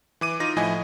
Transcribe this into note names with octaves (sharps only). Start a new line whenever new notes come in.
E3 D6 D#7
D#4 F4 A#6
A2 F3 E4 D#5 G#5